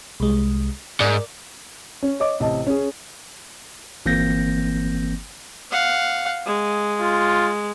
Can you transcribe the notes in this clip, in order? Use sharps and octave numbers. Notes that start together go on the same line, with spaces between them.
C2 G#3
G#2 A#4 D5
C#4
C#5 D#5 D6
A1 C3 D#5 A5
C#4 G#4
G1 E3 A#3 C4 G6 A#6
F5 F#5
G#3
F4